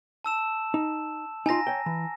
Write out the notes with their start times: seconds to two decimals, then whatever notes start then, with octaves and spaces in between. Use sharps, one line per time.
0.25 A5 E6 E7
0.74 D#4
1.46 D#4 F4 G#5 A#5 A#6
1.67 C#5 G5
1.86 E3